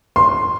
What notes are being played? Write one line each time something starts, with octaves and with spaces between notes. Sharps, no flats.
C6